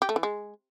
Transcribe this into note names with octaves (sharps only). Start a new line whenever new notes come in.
G4
A3
E3
G#3